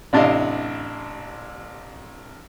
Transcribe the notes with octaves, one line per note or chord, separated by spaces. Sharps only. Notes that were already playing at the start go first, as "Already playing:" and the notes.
A1 C3 D4 E4 D#5 F5